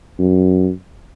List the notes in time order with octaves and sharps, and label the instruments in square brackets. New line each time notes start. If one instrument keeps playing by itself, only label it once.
[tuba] F#2